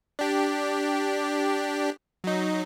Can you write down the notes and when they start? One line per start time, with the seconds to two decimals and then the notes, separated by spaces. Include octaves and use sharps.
0.19 D4 G4
2.24 F#3 D#4